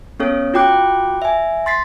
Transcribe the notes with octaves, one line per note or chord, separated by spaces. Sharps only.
B3 C#4 A4 C#5
F4 F#4 G5 D6 F#6
E5 G#5
C6 A6 B6 C7